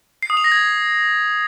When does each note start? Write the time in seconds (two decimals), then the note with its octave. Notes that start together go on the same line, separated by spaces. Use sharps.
0.23 C7
0.30 D#6
0.37 F7
0.44 A#6
0.52 G#6